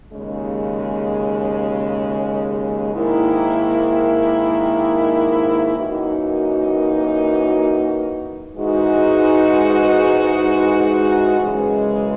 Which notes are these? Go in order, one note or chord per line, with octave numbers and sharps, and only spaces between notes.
D#2 C#3 G#3
G#2 D#3 A#3 E4
F#2 E3 A#3 D#4 F#4
G#2 E3 G#3 D#4 F#4
F#2 C#3 E3 G#3